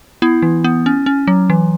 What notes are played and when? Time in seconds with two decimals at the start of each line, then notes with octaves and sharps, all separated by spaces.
0.22 B3 E4
0.42 E3
0.64 B3
0.86 C#4
1.06 C#4
1.27 F#3
1.50 E3